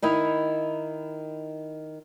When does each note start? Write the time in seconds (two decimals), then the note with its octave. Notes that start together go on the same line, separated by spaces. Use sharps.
0.02 D#3 D#4 E4